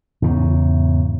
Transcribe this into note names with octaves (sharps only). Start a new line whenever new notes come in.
E2 G#2 C#3